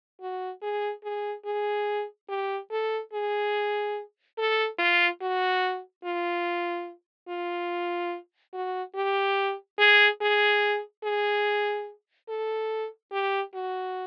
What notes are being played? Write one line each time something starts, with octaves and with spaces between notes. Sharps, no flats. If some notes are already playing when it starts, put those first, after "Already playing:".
F#4
G#4
G#4
G#4
G4
A4
G#4
A4
F4
F#4
F4
F4
F#4
G4
G#4
G#4
G#4
A4
G4
F#4